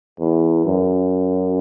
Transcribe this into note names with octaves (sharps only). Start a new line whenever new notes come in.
E2
F#2